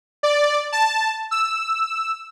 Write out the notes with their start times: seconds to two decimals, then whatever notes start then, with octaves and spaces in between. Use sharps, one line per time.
0.23 D5
0.72 A5
1.31 E6